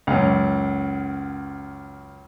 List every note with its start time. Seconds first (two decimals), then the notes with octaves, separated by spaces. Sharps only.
0.07 C#2 F#2